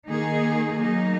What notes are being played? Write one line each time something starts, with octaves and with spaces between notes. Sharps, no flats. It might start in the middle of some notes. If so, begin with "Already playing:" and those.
D#3 A#3 D#4 G#4
F#3 A#3 D#4